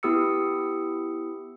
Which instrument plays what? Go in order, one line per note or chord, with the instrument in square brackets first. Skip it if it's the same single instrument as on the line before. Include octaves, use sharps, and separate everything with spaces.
[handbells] B3 E4 G4 D#6 E6 C#7